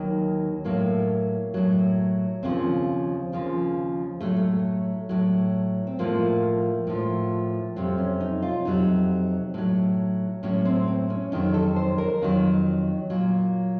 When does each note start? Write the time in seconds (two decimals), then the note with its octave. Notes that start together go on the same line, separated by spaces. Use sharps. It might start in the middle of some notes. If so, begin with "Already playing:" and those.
Already playing: D#2 D#3 F#3
0.65 A2 F#3 A#3
1.54 A2 F#3
2.43 D#2 C#3 F3 C4
3.32 D#2 C#3 F3
4.21 A2 F#3 A3
4.36 A3
5.09 A2 F#3
5.87 C4
5.99 A2 F3 A#3
6.87 A2 F3
7.76 F2 C3 F#3 C4
7.98 C#4
8.20 D#4
8.42 F4
8.65 F2 C3 F#3 D#4
9.54 A2 F#3
10.43 A2 F#3 C#4
10.65 C4
10.88 C4
11.10 C#4
11.32 F2 D#3 F#3 D#4
11.54 A4
11.76 C5
11.98 A#4
12.21 F2 D#3 F#3
13.10 A#2 F#3